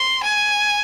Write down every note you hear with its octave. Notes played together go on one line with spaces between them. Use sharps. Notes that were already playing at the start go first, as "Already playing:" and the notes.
Already playing: C6
G#5